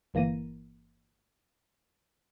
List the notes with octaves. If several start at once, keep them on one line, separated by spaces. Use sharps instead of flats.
G1 E3 A#3 A#6 D#7